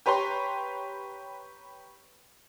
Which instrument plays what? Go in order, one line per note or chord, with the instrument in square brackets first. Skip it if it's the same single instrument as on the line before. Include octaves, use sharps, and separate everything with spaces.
[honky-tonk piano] G4 B4 C#5 A#5 C6